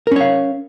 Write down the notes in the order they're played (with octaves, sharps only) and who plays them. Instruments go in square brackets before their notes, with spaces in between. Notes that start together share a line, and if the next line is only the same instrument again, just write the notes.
[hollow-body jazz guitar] A#4
C#4
C#5
F5